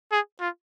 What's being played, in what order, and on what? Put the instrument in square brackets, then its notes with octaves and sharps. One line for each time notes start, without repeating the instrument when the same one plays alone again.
[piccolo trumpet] G#4
F4